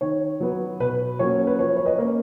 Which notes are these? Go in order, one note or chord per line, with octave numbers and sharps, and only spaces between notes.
D#3 C#5
F#3 B3
B2 B4
F#3 A#3 C#4 C#5
B4
F3 C#5
C#5
B4 D#5
A#3 C#4